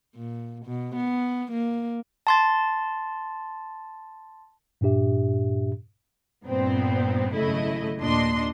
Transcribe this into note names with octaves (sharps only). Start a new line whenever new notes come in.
A#2
B2
B3
A#3
A5 C6 A6
G2 A#2 D4 G4 E5
G2 A#2 B3 C4
G#1 F#2 C#3 A3 E4 D#5
D#2 A#2 D4 D#5 C6